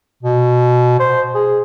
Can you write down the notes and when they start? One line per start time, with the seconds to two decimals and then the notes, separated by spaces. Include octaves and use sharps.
0.23 B2
0.99 C5
1.35 G#4